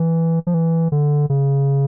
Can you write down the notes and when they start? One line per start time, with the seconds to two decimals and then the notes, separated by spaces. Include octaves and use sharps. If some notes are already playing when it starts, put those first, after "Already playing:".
Already playing: E3
0.47 F3
0.54 E3
0.92 D3
1.30 C#3